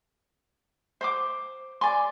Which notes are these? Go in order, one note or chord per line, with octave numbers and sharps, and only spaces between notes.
C5 C6 D6
D5 G#5 C6